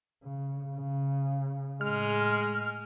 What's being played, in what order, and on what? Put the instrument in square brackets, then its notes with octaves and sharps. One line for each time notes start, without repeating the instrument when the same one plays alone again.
[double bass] C#3
C#3
[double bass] A2 [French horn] G#3 [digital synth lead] F6